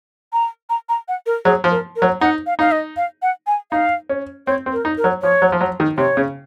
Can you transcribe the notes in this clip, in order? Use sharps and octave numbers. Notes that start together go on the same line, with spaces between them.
A#5
A#5
A#5
F#5
A#4
F#3 G#4
F3
A#4
A#4
F#3
D#4 F#5
F5
D#4 F5
D#5
F5
F#5
G#5
D#4 F5
C#4
C4 C#5
C4
A#4
D#4
A#4
F#3
F3 C#5
F#3
F3
F#3
D#3
C3 C#5
C#3